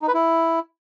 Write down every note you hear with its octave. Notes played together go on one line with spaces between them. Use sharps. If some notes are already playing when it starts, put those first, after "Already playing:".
D#4
B4
E4